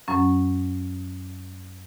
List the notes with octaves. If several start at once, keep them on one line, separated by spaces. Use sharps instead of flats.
F#2 F#3 C#4